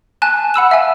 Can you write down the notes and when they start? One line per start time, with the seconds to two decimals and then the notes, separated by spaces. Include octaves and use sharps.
0.22 G#5 A5 F#6
0.54 F#5 B5 E6 E7
0.71 E5 F5 G#5 E6